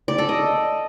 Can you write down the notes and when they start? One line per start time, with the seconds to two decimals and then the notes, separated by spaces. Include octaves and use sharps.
0.08 D5
0.18 A4
0.29 D#5